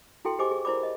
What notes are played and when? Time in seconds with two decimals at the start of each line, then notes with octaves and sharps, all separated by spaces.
0.25 E4 F#4 A4 G5 C6
0.39 G4 G#4 C5 D#5 G#5 D6
0.51 G#4
0.65 E4 A#4 C5 D5 B5 D6
0.83 D#5